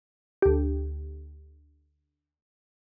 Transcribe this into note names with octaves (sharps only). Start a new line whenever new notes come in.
D2 G4